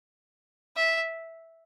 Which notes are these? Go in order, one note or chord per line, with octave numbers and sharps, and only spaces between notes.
E5